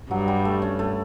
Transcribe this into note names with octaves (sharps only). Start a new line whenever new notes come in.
G2 F#3
G3
A3
C#4
A3